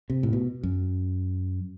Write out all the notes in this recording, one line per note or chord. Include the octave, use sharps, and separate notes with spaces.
C3
A2
B2
F#2